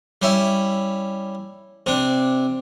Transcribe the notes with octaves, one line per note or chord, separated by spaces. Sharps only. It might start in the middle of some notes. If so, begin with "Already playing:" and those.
G3 C#4 E4
C3 D4